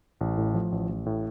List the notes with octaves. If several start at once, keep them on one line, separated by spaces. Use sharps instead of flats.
A1
A2
F3
A1
A1
A2